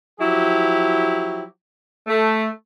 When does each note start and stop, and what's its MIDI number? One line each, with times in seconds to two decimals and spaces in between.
0.20 1.42 53
0.20 1.42 54
0.20 1.42 64
0.20 1.42 67
2.07 2.47 57